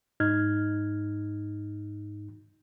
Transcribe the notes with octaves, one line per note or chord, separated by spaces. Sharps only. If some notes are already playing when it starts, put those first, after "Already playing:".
G#2 D#4 F6 G#6